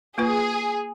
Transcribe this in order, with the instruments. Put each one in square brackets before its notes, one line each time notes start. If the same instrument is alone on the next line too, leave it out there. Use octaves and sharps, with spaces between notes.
[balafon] A#3 F4 B4 [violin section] G#4